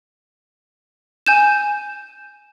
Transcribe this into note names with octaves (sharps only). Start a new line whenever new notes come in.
G#5 G6 E7